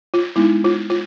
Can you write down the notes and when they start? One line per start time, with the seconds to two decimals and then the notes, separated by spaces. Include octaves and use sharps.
0.14 F4
0.36 G#3 B3 D#4 E4
0.64 F4
0.90 F4